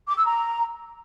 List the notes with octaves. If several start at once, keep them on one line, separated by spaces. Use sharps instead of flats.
D6
E6
A#5